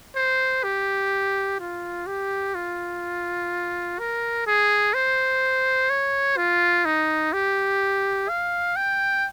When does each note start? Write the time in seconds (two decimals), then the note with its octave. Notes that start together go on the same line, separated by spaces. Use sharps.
0.15 C5
0.63 G4
1.60 F4
2.07 G4
2.55 F4
3.99 A#4
4.47 G#4
4.94 C5
5.90 C#5
6.37 F4
6.85 D#4
7.33 G4
8.29 F5
8.76 G5